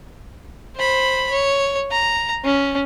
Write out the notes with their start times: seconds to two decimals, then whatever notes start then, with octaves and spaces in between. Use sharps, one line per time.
0.76 C5 B5
1.31 C#5
1.91 A#5
2.44 C#4